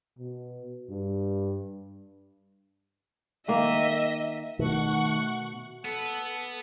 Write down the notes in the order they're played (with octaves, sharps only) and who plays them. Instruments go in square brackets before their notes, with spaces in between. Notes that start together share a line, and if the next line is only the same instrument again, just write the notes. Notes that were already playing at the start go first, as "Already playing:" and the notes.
[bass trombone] B2
G2
[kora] D#3 A#3 [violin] D#5 E5
[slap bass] B2 [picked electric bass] D#3 [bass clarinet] A3 [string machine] F#5 C#6
[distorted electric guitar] B3 [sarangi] A4